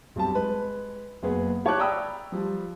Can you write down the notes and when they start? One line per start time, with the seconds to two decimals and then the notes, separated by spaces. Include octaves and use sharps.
0.15 B1 G2 C4 G4 A5
0.35 G#3 B4
1.23 F#1 A#3 B3 G#4 B4
1.65 G4 C#5 A5 D6 F#6
1.78 D5 G5 A#5 B5 D#6 E6
2.32 F3 G3